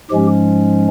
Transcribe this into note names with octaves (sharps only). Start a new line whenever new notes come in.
G#2 F3 G#3 C#4 G4